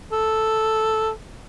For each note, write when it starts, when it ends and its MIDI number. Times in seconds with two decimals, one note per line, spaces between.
0.12 1.11 69